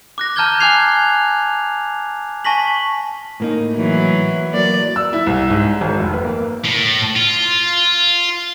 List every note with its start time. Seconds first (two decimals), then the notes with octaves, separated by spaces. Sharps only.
0.18 D6 F#6 A#6
0.36 A5 A#5 F6 G6 G#6 G7
0.60 G#5 D6 F#6 G#6 C7 F7
2.44 G#5 A5 C#6 A#6 B6 F#7
3.40 A2 A#3 D#4
3.75 E3 F#3
4.54 F#3 A#3 D5
4.96 E6
5.13 E4
5.27 C2
5.50 G#2
5.81 G#1
6.00 F1
6.13 B4
6.24 A#3
6.65 A2
7.16 F4